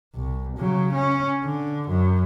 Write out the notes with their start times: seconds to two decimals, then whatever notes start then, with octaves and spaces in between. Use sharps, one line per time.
0.15 C2
0.58 C#3 F#3
0.93 C#4
1.43 D3
1.89 F#2